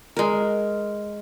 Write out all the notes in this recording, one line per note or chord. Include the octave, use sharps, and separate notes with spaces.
G#3 A#4